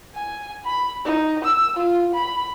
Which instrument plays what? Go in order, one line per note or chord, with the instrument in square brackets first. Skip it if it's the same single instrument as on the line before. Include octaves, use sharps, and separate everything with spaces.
[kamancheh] G#5
B5
D#4
E6
F4
B5